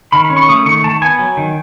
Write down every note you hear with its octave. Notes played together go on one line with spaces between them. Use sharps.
D#3 B5
B5
C#4
C#6
A3 D#6
D#3 C#6
D#3 A5
B3 G#5
F#3
D#3